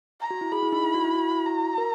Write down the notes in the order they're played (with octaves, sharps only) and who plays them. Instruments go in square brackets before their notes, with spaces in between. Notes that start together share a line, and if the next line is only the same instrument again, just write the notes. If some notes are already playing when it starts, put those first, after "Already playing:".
[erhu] A#5
[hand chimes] F#4
E4
[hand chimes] G#4 [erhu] B5
[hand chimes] E4
D#4
E4
F#4
E4
F#4
E4
[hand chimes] F#4 [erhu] A#5
[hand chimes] A#4